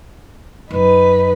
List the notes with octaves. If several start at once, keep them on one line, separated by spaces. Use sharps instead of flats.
F#2 D#4 B4